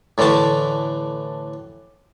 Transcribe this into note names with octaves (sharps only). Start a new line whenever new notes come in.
A2 D3 E3 A3 A5